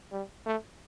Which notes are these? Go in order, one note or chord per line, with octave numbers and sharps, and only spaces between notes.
G3
A3